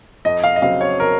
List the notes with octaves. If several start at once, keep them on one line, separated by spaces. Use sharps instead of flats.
F2 D#5
F5
D#5
C#3 F#3 C4 F5
C#5
A#4